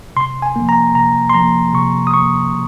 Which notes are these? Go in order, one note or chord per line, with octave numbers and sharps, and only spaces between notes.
C3 C6
G#5
F3 A#3
A#5
C3 A#5
C6
F3 A#3 A#5
C3 C#6
D#6
F3 A#3 C#6
C3